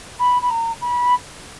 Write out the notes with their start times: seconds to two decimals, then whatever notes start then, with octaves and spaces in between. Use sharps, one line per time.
0.19 B5
0.42 B5
0.50 A#5
0.81 B5